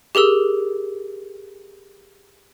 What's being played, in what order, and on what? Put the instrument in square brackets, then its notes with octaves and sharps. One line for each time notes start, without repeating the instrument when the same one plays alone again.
[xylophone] G4 G#4 A#4 E6